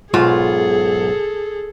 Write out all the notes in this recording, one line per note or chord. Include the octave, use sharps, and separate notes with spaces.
B1 G#2 F4 G#4 A4